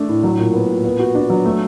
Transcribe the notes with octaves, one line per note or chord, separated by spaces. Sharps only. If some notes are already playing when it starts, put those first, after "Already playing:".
Already playing: A3 D4
A2
F#3
A#2
B3
A#2
B3
F#4
D4
F#3
A3